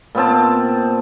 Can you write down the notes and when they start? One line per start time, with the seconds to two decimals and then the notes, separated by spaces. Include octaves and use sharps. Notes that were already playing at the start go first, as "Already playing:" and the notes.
0.15 A#2 B3 C4 A5